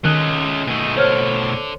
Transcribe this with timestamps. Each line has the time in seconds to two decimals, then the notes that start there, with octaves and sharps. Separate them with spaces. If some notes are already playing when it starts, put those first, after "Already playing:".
0.05 D#3 G#3 A3 C#4 D#5 F#6
0.67 B2 A3 D#4 G#4
0.96 D3 C5 C#5 F6